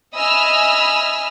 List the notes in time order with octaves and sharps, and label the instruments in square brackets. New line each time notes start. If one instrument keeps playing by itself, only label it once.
[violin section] D#5 E5 G#5 B5 E6 F6